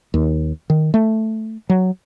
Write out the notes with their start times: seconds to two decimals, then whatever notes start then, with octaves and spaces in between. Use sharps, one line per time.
0.14 D#2
0.70 D#3
0.94 A3
1.69 F#3